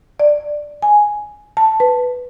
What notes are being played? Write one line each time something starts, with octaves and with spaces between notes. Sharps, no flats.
D5
G#5
A5
B4